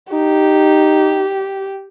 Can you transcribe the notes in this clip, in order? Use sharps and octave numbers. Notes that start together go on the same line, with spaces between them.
D#4 G4